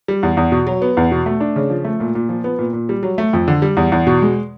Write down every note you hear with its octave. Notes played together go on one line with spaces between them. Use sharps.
G3
E2
E2
B2
F#3
B3
E2
B2
A3
D4
C#3
F3
A3
A#2
A#2
F3
B3
A#2
A#2
G3
F#3
A3
F2
D3
G3
E2
E2
B2
G#3